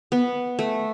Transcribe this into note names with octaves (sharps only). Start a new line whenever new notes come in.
B3
A3